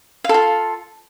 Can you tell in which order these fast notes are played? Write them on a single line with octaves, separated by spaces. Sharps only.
F5 A4 F4